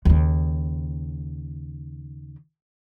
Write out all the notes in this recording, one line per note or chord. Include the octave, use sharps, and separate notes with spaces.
D#2 C#3